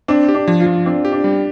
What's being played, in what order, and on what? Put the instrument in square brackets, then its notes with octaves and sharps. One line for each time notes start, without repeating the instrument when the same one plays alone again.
[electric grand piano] C4 [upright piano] D4
[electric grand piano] G4
[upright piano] D4
[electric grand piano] F3
[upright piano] F4
[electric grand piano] F3
[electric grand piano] C4 [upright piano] D4
[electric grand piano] G4
[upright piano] D4
[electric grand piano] G3